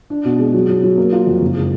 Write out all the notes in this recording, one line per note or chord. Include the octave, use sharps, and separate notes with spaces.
D4
B2
G#3
F#3
F#3
F#3
A#3
F4
F2
F#1
G#3